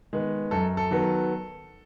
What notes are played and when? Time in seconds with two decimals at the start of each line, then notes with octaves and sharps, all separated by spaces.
0.13 D#3 G#3 B3
0.51 F#2 A4
0.77 A4
0.91 D#3 F#3 B3